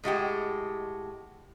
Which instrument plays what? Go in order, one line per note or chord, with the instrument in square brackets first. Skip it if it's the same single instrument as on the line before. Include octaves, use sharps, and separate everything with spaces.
[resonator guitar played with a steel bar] A2 G#3 F#4 G4